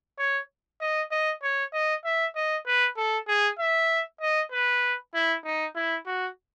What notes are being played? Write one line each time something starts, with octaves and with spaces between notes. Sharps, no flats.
C#5
D#5
D#5
C#5
D#5
E5
D#5
B4
A4
G#4
E5
D#5
B4
E4
D#4
E4
F#4